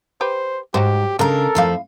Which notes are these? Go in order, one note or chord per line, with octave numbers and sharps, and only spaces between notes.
G4 B4 C5
G#2 F#3 A3 G4 C5
C#3 G#3 D4 A4 A#4 A#5
F2 F3 A3 E4 F5